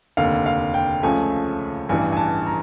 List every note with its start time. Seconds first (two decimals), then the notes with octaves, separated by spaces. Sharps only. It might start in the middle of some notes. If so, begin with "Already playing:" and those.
0.17 F1 D#2 D3 F5
0.46 F5
0.74 G5
1.03 C#2 C#3 F3 A3 G#5
1.89 A1 G2 E3 G#5
2.12 G#5
2.17 A5
2.47 A#5